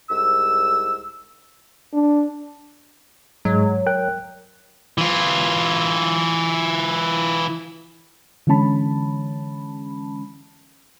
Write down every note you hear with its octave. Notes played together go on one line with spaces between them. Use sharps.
C2 G#2 E6
D4
G#2 F#3 G#3
A#4 G5 F#6
E3 F4
D3 E3 G#3 C#4 A5 B5